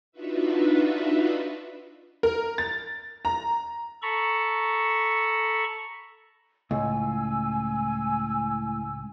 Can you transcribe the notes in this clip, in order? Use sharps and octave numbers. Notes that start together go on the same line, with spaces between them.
D4 D#4 F4 F#4 B4 E5
A#4
A6
A#5
A4 A#5 B5 C#6
C#2 A2 G#5 E6